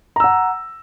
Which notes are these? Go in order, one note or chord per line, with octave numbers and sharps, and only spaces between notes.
F#5 A#5 E6